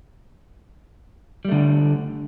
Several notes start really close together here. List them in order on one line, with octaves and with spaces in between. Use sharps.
G3 A3 D3